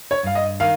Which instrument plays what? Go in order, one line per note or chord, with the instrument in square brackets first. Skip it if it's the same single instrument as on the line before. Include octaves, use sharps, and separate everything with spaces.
[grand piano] C#5
[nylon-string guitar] G2 [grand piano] F5
[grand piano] D#5
[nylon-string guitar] D#3 [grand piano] F5